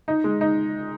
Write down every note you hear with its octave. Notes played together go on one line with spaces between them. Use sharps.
D#4
G#3
D#4